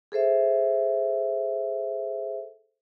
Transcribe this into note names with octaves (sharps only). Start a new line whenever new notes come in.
G#4 A4 C5 E5